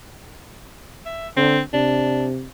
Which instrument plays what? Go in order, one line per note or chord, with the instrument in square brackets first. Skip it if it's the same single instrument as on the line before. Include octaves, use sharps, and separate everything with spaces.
[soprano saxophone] E5
[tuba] D3 [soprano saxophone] C4
[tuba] C3 [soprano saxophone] D4